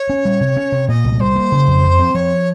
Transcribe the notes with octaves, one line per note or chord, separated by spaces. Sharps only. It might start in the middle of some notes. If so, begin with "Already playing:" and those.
Already playing: C#5
C#4
G3
C3
C#4
C3
A#2 D#5
C2
G3 C5
A#3
C#3
F2
F3
C4
F3 C#5